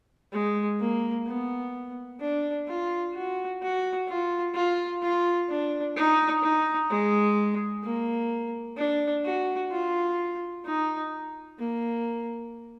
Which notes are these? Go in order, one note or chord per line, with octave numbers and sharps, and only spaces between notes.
G#3
A#3
B3
D4
F4
F#4
F#4
F4
F4
F4
D4
D#4
D#4
G#3
A#3
D4
F#4
F4
D#4
A#3